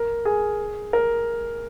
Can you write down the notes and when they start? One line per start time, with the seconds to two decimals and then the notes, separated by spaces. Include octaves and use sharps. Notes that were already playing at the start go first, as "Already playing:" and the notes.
Already playing: A#4
0.25 G#4
0.93 A#4